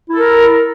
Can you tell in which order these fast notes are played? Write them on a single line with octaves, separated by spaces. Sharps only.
E4 A4 A#4